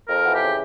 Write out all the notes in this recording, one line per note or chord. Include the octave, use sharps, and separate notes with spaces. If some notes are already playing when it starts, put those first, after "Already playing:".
F2 A#4
E3 F#4
G4
C#3